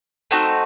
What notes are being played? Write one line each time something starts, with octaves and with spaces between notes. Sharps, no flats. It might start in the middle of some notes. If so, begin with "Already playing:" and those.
A3 C4 D#4 F#4